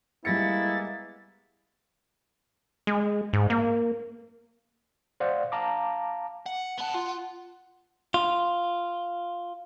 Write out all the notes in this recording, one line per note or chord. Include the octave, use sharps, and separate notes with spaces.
G3 G#3 A#3 B3 E4 A6 A#6 C#7
G#3
G#2
A#3
C5 D5 F5 F#5
F5 A5 A#5 D6
F#5
B3 F#5 A5
F4
F4